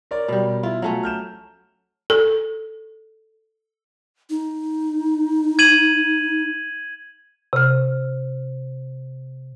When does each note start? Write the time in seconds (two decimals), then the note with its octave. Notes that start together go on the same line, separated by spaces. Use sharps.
0.11 A#4 C#5 D5
0.28 B2 G3
0.63 E4 F4
0.82 F#3 A3 C#4 F4
1.03 F6 G6 E7
2.10 A4
4.30 D#4
5.59 G#6 D#7 F#7
7.53 C3 F6